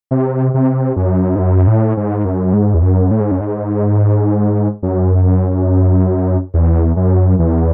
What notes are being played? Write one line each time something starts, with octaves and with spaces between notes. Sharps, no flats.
C3
C3
F#2
G#2
F#2
A2
G#2
F#2
G#2
E2
F#2
A2
G#2
F#2
G#2
F#2
E2
F#2
E2